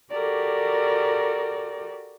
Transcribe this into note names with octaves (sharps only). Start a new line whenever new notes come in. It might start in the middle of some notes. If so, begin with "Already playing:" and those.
F#4 G4 A4 A#4 D5